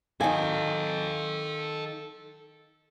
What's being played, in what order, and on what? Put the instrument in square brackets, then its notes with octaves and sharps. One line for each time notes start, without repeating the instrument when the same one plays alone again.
[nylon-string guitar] D#3 G#5 [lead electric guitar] A4 F5